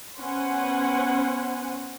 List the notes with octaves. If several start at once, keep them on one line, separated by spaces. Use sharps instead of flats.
B3 C#4 B4 C5 F#5 G#5